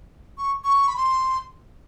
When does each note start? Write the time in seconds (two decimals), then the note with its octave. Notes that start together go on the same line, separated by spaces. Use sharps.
0.38 C#6
0.64 C#6
0.88 B5
0.97 C6